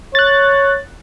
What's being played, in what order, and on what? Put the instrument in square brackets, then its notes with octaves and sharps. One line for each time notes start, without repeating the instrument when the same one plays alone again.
[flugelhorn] C#5 [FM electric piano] F#6 A6